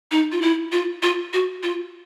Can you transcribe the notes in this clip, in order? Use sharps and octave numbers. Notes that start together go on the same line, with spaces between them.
D#4
F4
E4
F4
F4
F#4
F4